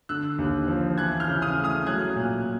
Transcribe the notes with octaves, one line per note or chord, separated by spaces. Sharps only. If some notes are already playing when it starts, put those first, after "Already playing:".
D3 E6 F#6
D#2
F3
E3 F#6 G#6
F6 G6
C#3
D#6 F6
A3
D#6 F6
F#3 F#6 G#6
A#2